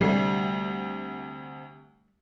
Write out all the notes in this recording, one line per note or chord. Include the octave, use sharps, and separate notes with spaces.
D2 C3 G3 A3 C7